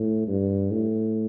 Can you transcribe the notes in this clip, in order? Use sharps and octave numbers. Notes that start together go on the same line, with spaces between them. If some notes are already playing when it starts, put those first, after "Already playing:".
Already playing: A2
G2
A2